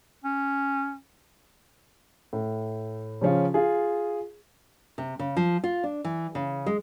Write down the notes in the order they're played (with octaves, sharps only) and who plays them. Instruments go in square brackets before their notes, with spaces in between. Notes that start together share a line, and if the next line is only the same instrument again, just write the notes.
[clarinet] C#4
[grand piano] A2
C#3 F3 C#4 F4
F4 G#4
[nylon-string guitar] C3
C#3
F3
F4
D4
E3
C#3
G#3